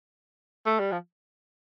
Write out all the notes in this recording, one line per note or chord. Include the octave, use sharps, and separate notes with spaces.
A3
G3
F3